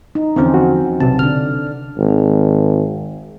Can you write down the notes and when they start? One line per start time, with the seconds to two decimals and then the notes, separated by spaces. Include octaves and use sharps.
0.15 D#4
0.36 E2 D3 F3 C4 C#4
0.54 F#4
1.00 B1 C3 A5
1.19 D3 D4 F6
1.97 G#1